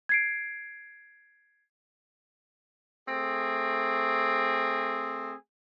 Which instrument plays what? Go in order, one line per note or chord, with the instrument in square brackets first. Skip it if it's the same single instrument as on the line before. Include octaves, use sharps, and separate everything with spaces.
[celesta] G#6 C7 D7
[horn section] A3 C4 G#4